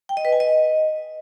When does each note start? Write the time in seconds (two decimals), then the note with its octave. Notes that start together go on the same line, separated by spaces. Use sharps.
0.09 G5
0.17 D#5
0.25 B4
0.32 G#5
0.40 D#5